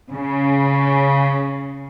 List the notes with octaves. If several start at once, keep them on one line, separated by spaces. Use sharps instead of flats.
C#3